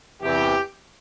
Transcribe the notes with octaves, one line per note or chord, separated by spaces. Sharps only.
E2 C3 E3 G4